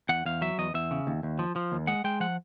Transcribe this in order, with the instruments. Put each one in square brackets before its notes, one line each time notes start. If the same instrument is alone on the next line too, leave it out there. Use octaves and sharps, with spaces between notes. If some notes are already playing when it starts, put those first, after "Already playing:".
[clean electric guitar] E2 F#5
E2 F5
F#3 E5
E2 D#5
E2 E5
C#3
D#2
D#2
F3
F3
D#2
G#3 F#5
G#3 G5
F3 F#5